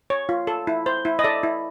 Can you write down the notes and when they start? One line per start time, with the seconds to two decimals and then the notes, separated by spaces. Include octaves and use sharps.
0.10 C#5
0.29 F4
0.47 A4
0.67 E4
0.86 C5
1.05 E4
1.19 D#5
1.24 A4 D5 E5
1.43 E4